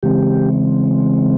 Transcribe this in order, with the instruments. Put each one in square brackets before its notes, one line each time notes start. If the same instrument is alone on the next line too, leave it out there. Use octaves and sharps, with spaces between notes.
[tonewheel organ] C#3 E3 G#3 C4 G4